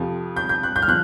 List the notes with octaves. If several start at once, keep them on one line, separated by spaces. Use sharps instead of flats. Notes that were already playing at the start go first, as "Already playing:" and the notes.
Already playing: F2 C3 F3
G6
G6
F#6
G6
F6
F3 F#6